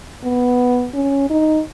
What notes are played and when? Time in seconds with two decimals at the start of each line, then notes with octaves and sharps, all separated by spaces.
0.24 B3
0.94 C#4
1.30 D#4